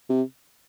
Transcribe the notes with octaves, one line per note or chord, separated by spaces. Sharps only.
C3